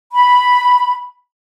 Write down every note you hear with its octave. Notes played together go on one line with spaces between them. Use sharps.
B5